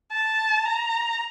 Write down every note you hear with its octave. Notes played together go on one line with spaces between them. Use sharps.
A5
A#5